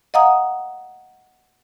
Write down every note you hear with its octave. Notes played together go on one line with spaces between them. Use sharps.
D#5 F5 F#5 A#5 D#6